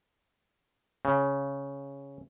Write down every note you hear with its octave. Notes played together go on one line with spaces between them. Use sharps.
C#3